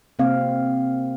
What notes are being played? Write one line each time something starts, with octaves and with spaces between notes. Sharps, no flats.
C3 A#3 C4 F5